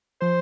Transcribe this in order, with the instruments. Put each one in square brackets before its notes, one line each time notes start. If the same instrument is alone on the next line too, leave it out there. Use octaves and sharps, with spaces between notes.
[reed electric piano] F3 [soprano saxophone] C5